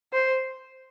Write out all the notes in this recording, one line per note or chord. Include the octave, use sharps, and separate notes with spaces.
C5